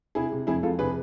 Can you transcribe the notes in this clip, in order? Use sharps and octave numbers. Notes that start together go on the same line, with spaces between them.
C3 E4 G#4
C3
F2 E4 G#4
F2 F4 A4
C3 G#4 B4